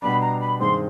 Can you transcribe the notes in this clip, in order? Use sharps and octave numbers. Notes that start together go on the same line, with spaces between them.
B2 G3 B3 D4 B5
A#5
B5
G2 D#3 G#3 C4 C6